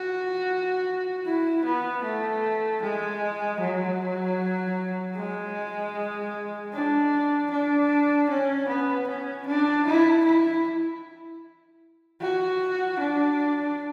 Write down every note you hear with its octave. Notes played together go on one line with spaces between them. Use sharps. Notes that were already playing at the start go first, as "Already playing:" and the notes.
Already playing: F#4
E4
B3
A3
G#3
F#3
G#3
D4
D4
C#4
B3
C#4
D4
E4
E4
F#4
D4